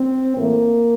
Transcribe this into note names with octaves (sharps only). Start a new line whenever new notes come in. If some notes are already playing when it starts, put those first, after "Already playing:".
Already playing: C4
A2 E3 A3 A#3